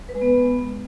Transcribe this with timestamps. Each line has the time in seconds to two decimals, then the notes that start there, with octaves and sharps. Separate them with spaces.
0.09 B4
0.15 G#3
0.21 B3